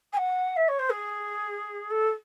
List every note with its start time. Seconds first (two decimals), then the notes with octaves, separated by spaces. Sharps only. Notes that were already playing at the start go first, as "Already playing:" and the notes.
0.12 G#5
0.17 F#5
0.56 E5
0.68 C#5
0.79 C5
0.89 G#4
1.90 A4